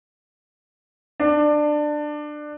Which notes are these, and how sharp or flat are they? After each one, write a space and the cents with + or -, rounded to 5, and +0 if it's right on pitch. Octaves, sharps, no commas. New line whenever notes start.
D4 +20